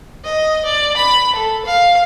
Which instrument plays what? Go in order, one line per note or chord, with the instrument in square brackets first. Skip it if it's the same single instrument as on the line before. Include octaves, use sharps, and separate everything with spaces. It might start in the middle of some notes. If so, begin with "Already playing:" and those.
[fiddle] D#5
D5
B5
A4
F5